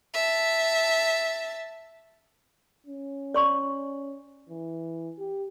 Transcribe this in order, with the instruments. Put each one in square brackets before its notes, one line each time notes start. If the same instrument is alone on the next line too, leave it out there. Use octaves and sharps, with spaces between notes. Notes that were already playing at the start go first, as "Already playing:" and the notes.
[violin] E5 A5
[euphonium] C#4
[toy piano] D5 C6 C#6
[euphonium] E3
G4